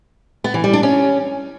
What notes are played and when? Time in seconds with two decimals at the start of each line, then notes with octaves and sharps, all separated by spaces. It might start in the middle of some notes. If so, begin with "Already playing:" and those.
0.44 B3
0.54 E3
0.64 G3
0.73 D4
0.83 C#4